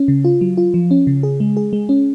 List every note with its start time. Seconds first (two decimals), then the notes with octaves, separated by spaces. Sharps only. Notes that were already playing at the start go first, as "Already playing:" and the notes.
Already playing: C#4
0.08 C#3
0.24 F4
0.41 F#3
0.57 F4
0.74 F3
0.91 C#4
1.07 C#3
1.23 G#4
1.40 G#3
1.57 G#4
1.73 G#3
1.89 C#4